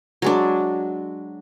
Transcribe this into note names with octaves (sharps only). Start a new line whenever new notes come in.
F#3 G#3 D4